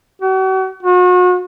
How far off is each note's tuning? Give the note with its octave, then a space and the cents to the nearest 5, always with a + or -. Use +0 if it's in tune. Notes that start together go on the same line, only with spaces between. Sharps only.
F#4 +40
F#4 -40